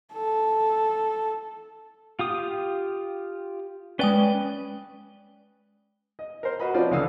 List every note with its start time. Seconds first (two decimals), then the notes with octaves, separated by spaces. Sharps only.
0.13 A4
2.19 F4 G4 D#6
3.99 G#3 C#4 B4 D5 G5 G7
6.19 D#5
6.43 A#4 C5
6.59 F#4 B4 D#5 B5
6.74 F3 C4 C#4 F4 D5
6.91 C#2 D3 E3 F5 D#6 E6